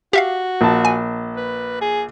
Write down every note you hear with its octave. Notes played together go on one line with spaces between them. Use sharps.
F#4 G4 E5 F5
A#1 A5
G#5
B4
G#4